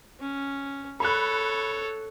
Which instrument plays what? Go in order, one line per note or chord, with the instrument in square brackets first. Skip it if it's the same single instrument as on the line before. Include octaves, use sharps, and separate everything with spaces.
[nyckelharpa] C#4
[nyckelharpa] A4 C#5 [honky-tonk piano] B5 F#6